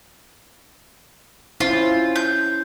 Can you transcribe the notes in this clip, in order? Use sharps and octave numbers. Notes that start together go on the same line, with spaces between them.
C#4 E4 F4 C5
G6